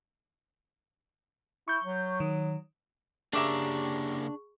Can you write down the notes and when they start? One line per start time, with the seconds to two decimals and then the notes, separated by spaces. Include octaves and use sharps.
1.68 E4 C#6 G6
1.84 F#3
2.20 D#3
3.33 C#3 A#3 D4 G4 G#4 E5 A#5 C#6